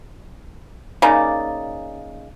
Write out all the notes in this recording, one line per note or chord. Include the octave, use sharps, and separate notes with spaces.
C#3 A#3 D#4 D5